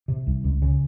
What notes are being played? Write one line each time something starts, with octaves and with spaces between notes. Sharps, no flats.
C3
C2
C#2
C#3